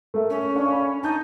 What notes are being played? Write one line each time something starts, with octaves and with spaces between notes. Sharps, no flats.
A3 A#4 E5
C#4
D4 F5 C#6
B5
D#4 A5 G6